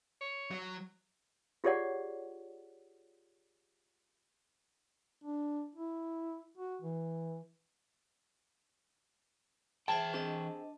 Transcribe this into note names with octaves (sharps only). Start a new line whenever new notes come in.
C#5
F#3
F4 G4 G#4 C#5 D5 F#5
D4
E4
F#4
E3
E3 G#4 C5 E5 G5 A5
C4 D4 G4 G#4 D#5